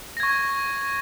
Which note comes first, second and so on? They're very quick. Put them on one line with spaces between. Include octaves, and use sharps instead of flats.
A#6 G#6 C#6